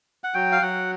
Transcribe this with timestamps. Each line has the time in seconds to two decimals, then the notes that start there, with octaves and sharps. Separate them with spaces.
0.24 F#5
0.34 F#3 G5
0.52 F5
0.62 F#3 F#5